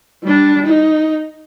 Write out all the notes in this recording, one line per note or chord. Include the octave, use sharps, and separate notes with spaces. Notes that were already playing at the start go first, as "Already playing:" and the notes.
G3 D4
D#4